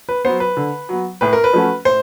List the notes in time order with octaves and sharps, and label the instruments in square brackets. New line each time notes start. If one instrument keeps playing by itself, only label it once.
[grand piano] B4
[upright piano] F#3 B3 [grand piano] C5
[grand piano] B4
[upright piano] D3
F#3 B3
[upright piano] A2 [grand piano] B4
[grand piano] A#4
B4
[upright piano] F3 A3 C#4 F#4
[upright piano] A2 [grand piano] C5